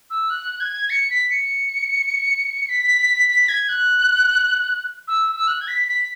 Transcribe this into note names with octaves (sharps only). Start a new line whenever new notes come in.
E6
F#6
G#6
C#7
B6
C#7
B6
B6
G#6
F#6
E6
E6
F#6
G#6
B6
B6